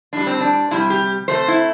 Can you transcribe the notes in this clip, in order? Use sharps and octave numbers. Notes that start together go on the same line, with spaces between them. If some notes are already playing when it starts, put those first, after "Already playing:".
A2 G3 D4
C4
D4
C3 G3 E4
G4
C3 A3 C5
E4